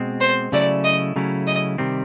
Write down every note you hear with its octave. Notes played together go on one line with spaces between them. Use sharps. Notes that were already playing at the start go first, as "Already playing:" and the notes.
Already playing: B2 G#3 C4
C5
C#3 F#3 A3 C#4 E4 D5
D#5
C#3 F#3 A3 C#4 E4
D#5
C3 D#3 G3 C4